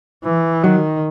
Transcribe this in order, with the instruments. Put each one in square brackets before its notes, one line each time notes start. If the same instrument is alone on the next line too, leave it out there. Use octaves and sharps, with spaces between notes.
[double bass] E3
[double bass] D#3 [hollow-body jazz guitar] F#3